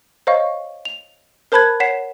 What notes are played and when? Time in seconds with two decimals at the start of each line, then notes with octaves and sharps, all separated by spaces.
0.27 C5 C#5 D#5 F5 C#6
0.85 F7
1.52 A#4 C5 A5 B5 F#6 G#6
1.80 C#5 F#5 B6 C7 E7